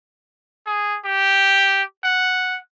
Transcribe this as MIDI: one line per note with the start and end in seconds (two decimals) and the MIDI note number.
0.67 0.98 68
1.05 1.83 67
2.04 2.59 78